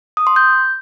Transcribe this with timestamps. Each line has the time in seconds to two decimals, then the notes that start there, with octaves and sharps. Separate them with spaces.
0.17 D#6
0.27 C6
0.36 G6